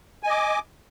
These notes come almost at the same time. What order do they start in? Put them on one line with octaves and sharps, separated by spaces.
G#5 D#5 D6